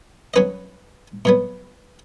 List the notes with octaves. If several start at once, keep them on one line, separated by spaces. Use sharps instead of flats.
F#3 C#4 B4 D#5
B2 F#3 B3